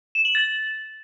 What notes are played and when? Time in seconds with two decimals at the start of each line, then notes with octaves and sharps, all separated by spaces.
0.15 E7
0.25 F#7
0.35 A6